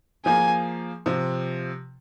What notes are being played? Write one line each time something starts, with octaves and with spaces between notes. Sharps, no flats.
F3 A#3 G#4 G#5
C3 F3 C4